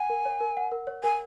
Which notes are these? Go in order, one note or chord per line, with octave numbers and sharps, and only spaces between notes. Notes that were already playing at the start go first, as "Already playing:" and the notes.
Already playing: F#5 G#5
A#4
C#5
A#4
F#5
A#4
C#5
A#4 G#5